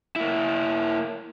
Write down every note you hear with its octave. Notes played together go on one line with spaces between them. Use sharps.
A#3 E4